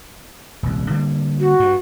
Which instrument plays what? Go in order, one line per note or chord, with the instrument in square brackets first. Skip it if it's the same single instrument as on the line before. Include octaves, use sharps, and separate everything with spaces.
[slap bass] D#1 C2
D3 G3 A#3
[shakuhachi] F#4
[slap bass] G2